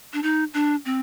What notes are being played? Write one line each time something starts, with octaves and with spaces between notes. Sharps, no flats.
D4
D#4
D4
C4